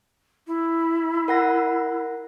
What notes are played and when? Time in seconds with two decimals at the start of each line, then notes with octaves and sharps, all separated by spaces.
0.47 E4
1.28 A#4 F#5 A#6